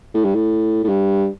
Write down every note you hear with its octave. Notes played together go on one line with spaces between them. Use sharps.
A2
G2
A2
A2
G2